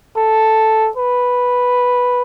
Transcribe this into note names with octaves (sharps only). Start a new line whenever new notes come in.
A4
B4